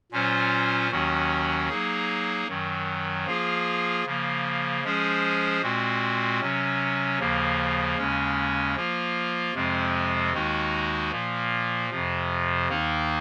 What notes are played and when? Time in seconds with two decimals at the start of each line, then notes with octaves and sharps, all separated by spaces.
0.12 A#2 F#3 C#4 F4 C5
0.91 D#2 D#3 F#3 C#4 F#4
1.69 F#3 A#3 D#4 G#4
2.47 F#2 D#3 F#3
3.26 F3 A#3 F4 G#4
4.05 C#3 F3 A#3
4.83 F3 G#3 C#4 G#4 C5
5.62 A#2 G#3 C4 F#4
6.40 C3 F#3 C#4
7.19 D#2 C#3 F3 A#3
7.97 D#2 C#3 G#3 C#4
8.76 F3 A#3 F4
9.54 F2 C3 F3 G#3 C4
10.33 D#2 D#3 G#3 D#4 F#4
11.11 A#2 F3 A#3
11.90 F2 C3 F3
12.69 D#2 D#3 A#3 D#4